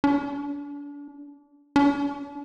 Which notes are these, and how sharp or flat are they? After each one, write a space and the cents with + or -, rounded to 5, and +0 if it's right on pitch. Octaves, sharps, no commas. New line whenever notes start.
D4 -35
D4 -40